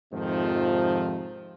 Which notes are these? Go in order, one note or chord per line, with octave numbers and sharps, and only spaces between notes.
F2 G#2 C3 D#3 F3